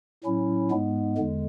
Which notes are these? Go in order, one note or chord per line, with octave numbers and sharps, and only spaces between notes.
A2 F#3 C#4 E4
G#2 G#3 B3
E2 D3 G#3